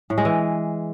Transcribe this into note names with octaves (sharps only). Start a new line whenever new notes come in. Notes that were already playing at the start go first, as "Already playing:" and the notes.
A2
G#3
E3